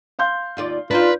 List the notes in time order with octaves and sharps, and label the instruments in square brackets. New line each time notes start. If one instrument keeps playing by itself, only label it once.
[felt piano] F5 C6 G6
[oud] D#2 F4 D5
[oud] D4 D#4 C5 [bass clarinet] F4 [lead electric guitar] B4